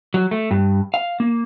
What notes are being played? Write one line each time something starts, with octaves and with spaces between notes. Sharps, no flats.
F#3
A3
G2
F5
A#3